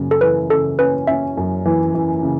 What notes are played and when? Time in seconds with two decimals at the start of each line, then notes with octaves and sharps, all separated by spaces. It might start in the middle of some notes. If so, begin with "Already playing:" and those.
Already playing: F#2 C#3
0.11 A4
0.21 E3 B4
0.50 C#3 A4
0.79 C#4 B4
1.07 C#4 E5
1.37 F#2
1.65 E3
1.94 E3
2.23 C#3